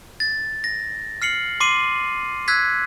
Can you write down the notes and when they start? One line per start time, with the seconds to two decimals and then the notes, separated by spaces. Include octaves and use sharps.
0.20 A6
0.64 A#6
1.22 F6 C7 C#7 F#7
1.60 C6 D6 C7 D#7
2.48 E6 F#6 G#6 B6